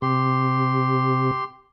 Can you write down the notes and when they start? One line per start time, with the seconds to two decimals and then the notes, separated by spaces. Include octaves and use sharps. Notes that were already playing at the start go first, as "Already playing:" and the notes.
0.02 C3 G4 C6